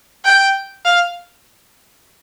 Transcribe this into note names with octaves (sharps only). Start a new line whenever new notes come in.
G5
F5